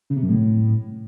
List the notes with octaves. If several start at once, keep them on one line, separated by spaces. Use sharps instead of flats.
C#3
C3
F#2
A2